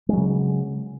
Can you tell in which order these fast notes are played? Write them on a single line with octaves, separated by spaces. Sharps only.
G#3 F#3 C#3